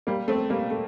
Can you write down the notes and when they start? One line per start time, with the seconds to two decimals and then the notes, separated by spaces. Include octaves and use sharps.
0.07 G3 A#3
0.28 A3 C4
0.50 G3 A#3
0.70 A3